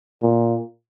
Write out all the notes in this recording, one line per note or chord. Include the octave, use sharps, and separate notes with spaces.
A#2